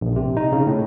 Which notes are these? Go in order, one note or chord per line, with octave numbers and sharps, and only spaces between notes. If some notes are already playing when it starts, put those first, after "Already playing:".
A#1
C3
D#4
C#3
A2